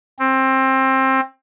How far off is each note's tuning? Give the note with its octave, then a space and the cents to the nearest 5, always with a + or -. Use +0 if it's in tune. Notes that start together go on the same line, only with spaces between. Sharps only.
C4 +20